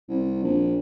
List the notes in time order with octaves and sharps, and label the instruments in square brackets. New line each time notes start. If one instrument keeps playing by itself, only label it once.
[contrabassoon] C2
A#1